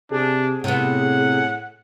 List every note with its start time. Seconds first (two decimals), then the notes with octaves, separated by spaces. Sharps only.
0.12 C3 D4 G#4
0.64 A2 C3 B3 F#5